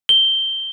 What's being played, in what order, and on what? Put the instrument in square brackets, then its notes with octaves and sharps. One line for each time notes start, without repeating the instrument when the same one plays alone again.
[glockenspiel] G7